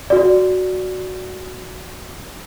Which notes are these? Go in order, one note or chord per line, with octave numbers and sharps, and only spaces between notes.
F#4 D5